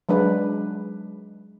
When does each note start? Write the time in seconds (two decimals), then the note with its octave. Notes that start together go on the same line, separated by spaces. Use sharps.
0.09 F#3 G#3 D4 B4